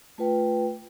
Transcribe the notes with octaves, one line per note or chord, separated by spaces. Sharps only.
A3 F4 B4 G5